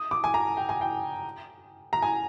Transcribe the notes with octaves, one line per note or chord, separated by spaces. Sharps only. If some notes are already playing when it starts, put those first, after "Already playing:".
Already playing: D#6
D6
G#5
A#5
G5
G#5
G5
A#5
G#5